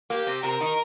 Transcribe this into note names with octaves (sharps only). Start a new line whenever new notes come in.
A#3 G4
C3 C4
C3 C4 A#4
D#3 D#4